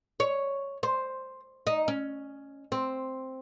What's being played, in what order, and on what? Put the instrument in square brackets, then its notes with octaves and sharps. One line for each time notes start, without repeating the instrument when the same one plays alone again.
[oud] C#5
C5
D#4
C#4
C4